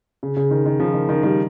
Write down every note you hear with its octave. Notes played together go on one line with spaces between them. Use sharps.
C#3
C#3
D#3
D#3
C#3 F3
D#3
D#3
D#3 G3